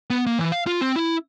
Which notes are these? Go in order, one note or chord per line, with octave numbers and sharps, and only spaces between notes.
B3
A#3
E3
F5
F4
C4
E4